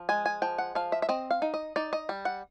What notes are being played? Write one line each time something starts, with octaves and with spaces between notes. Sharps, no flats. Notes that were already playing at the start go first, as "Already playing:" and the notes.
Already playing: F3
G#3 G#5
G#5
F3 G5
F#5
F3 F5
E5
E5
C4 D#5
F5
D#4
D#5
D#4 D5
D#5
G3
F#5